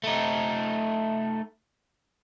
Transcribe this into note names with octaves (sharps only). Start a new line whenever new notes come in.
A3 D#4